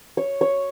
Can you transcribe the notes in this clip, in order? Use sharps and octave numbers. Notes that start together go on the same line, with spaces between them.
C#5
C#5